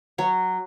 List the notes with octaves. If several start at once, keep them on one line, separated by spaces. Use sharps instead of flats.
F#3 C#5